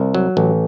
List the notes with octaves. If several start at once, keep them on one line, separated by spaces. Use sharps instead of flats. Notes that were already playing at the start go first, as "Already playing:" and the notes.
Already playing: C2
F#3
A1